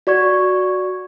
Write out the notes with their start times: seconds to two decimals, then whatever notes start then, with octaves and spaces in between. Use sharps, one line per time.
0.07 F#4 D5 C#6 G#6